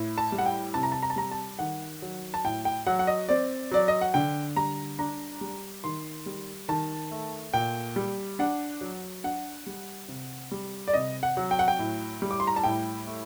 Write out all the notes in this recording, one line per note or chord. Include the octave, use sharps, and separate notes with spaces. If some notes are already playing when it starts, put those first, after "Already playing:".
Already playing: A2
A5
G3
F#5
G5
C3 A5
A#5
A5
A#5
A5
G3 A#5
A5
D#3 F#5
F#3
A5
A2 G5
G5
F#3 F#5
F#5
D#5
C4 D5
F#3 D5
D#5
F#5
D3 G5
G3 A#5
D4 A#5
G3
D#3 C6
G3
D#3 A5
A3
A#2 G5
G3
D4 F#5
F#3
D4 F#5
G3
C3
G3
D5
C3 D#5
F#5
F#3
G5
F#5
G5
A2
G3
D6
C6
A#5
A5
A2 G5
A3